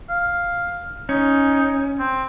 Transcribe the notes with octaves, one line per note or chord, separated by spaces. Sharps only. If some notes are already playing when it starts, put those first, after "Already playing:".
F5
C#4 D#4
C4